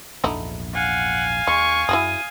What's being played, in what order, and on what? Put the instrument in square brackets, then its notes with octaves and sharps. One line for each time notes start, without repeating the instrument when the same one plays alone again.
[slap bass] A#1 E2 G#2 [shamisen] D3 D#4 E4
[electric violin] F5 G#5 [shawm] F#5
[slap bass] D#2 [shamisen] G#3 [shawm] C#6
[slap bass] F#2 [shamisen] E4 F#4 G#4 [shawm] D#6